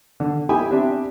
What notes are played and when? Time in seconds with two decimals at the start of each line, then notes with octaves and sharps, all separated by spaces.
0.20 D3
0.49 E4 G4 G5 G#5 B5 D#6
0.71 C4 D4 G4 E5